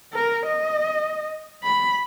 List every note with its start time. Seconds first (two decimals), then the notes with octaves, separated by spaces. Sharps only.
0.14 A#4
0.46 D#5
1.63 B5